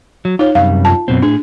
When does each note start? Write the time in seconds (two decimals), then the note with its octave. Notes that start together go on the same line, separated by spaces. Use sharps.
0.25 F#3
0.39 D#4 F4 C#5
0.55 F#2 C3 G3 F5
0.85 F4 A5
1.08 F#2 B2 C4
1.22 A2 D4 G#4